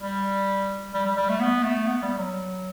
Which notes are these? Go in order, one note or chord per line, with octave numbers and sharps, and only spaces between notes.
G3
G3
G3
G3
A3
B3
A3
B3
G3
F#3